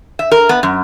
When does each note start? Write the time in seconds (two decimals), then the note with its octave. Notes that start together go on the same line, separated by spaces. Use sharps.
0.19 E5
0.32 A#4
0.49 B3
0.63 F#2